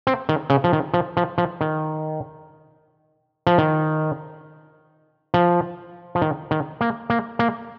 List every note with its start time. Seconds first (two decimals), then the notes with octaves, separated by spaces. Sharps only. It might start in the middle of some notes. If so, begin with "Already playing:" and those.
0.07 C4
0.29 D#3
0.50 C#3
0.64 F3
0.73 D#3
0.94 F3
1.17 F3
1.38 F3
1.61 D#3
3.47 F3
3.58 D#3
5.34 F3
6.15 F3
6.22 D#3
6.51 D#3
6.81 A#3
7.10 A#3
7.39 A#3